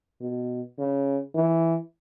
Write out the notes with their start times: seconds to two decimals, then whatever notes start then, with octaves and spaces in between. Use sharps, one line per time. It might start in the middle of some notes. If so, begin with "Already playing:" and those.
0.21 B2
0.79 C#3
1.35 E3